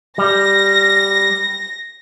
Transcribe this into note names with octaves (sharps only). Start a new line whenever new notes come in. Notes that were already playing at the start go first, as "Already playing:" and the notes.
G3 A#6